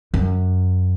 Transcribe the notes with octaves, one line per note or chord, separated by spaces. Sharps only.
F#2